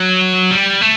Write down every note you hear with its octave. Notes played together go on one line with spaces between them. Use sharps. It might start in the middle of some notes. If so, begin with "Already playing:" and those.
Already playing: F#3
G3
A3